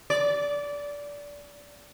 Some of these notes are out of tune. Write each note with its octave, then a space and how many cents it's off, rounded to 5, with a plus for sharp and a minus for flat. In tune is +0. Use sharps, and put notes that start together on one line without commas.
D5 -20